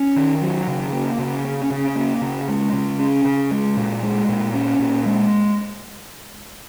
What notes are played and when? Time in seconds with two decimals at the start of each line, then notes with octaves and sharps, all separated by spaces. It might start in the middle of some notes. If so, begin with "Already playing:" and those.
Already playing: C#4
0.16 D#3
0.41 F#3
0.67 C#3
0.93 A#3
1.18 C#3
1.45 C#4
1.70 C#3
1.95 A#3
2.21 C#3
2.48 G#3
2.73 C#3
2.99 C#4
3.25 C#3
3.51 G#3
3.77 A#2
4.02 G#3
4.29 A#2
4.54 C#4
4.80 A#2
5.06 G#3